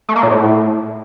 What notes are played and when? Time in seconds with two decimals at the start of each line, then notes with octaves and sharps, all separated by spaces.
0.09 A3
0.16 A#3
0.23 A#2
0.30 A2